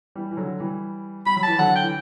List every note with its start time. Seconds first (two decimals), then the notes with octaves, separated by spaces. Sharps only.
0.15 E3 G3
0.31 E3
0.37 D3 F#3
0.60 E3 G3
1.26 G3 B5
1.36 F#3 B5
1.43 E3 A5
1.59 D3 F#3 F#5
1.75 G5
1.83 E3